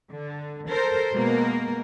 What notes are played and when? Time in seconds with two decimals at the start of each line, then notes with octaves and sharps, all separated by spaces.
0.11 D3
0.69 A4 A#4 C5
1.12 B2 G#3 A#3 A#4